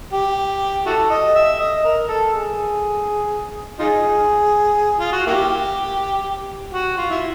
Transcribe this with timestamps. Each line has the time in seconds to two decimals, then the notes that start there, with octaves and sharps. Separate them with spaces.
0.13 G4
0.86 E4 F#4 A4
1.10 D#5
1.35 E5
1.59 D#5
1.85 A#4
2.08 A4
2.33 G#4
3.79 D#4 F4 G#4
5.00 F4
5.13 F#4
5.27 A#3 E4 G4
6.73 F#4
6.97 F4
7.10 E4